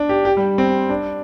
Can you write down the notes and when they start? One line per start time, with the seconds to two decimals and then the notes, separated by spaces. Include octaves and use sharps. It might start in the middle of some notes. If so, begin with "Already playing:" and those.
Already playing: D4
0.09 G4
0.25 G4
0.37 G3
0.58 C4
0.89 D4